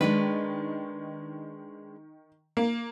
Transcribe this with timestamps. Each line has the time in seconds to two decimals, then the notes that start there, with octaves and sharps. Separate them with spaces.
0.01 D#3 G#3 D4 B4
2.57 A#3